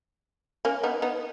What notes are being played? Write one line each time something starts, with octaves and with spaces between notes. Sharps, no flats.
A#3 C#4
B3 D#4
B3 D#4